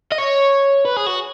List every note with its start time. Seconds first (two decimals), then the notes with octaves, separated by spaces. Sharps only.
0.12 D#5
0.18 C#5
0.85 B4
0.97 G#4
1.07 F#4